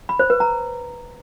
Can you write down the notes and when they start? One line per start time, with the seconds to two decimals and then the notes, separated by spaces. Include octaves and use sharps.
0.09 B5
0.19 C5
0.30 B4
0.40 A#5